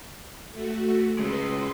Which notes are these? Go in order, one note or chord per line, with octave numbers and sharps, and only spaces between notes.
A3 F#4
C#3 G#3 B4 C6